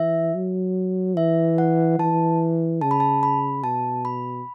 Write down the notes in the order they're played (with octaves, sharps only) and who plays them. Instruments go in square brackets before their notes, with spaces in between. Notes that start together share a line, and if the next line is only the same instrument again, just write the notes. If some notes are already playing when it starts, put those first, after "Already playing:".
Already playing: [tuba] E3 [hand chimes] E5
[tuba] F#3
[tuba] E3 [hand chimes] E5
[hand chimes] F#5
[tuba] E3 [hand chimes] A5
[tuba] C#3 [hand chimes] A5
[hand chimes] B5
A5
B5
[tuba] B2 [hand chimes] A5
[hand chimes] B5